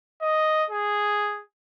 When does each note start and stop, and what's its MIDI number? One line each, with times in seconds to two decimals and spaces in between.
0.22 0.65 75
0.70 1.42 68